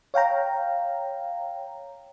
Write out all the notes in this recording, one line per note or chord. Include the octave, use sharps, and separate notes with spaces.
C#5 F5 G5 A#5